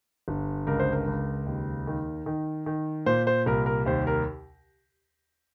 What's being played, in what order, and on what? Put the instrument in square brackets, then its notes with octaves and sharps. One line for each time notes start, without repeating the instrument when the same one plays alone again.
[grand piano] G1
C#2 A#4
C5
A#4
C#2
D#2
D#3
D#3
D#3
A#2 C5
C5
C2 A#4
A#4
D#2 C5
A#4